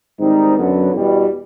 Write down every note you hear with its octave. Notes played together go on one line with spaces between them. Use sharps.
G#2 D#3 G3 C4 D#4
F#2 D3 F#3 B3
E2 B2 G3